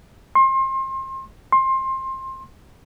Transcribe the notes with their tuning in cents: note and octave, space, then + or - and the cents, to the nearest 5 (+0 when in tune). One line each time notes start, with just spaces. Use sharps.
C6 +30
C6 +20